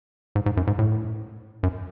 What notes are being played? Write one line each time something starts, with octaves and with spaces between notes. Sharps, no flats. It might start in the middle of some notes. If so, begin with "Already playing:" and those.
G#2
G#2
F#2
G#2
A2
F#2